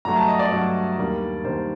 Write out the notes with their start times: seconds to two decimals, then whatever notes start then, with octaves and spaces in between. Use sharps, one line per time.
0.05 G2 F#3 A3 A#5
0.17 A5
0.28 D#5
0.39 D5
0.52 G2 F#3 A3
0.98 D#2 D#3 G3 A#3 D4
1.44 D#2 D#3 G3 A#3 D4 C5